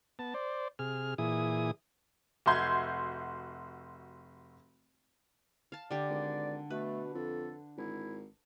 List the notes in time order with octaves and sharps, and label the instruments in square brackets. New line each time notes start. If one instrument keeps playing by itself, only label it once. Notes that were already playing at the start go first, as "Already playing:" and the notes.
[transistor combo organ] B3 A5
C5 D5
C3 G#4 F6
A#2 E3 E4 G#4 D#6
[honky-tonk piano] F1 F#4 E5 C6 G6 G#6
[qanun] F5 A5
[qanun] D3 G4 [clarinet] D5
[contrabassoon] G#1
[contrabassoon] B2 [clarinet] A3 [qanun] B4
[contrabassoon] F2 [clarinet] A4
[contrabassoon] G#1 [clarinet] E4